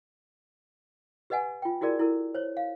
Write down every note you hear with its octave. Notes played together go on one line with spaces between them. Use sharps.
G4 B4 D#5 F#5 G#5
F4 G5
E4 F#4 G#4 A#4 D5
E4 A4 A#4
C5 C#5
F5